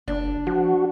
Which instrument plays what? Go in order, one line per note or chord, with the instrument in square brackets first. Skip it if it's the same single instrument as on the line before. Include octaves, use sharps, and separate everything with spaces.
[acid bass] F#1 [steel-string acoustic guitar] D4
[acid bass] F3 [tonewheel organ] F#4